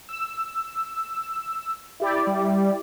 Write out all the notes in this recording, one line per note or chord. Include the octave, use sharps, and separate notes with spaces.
E6
E4 G4 D5
G3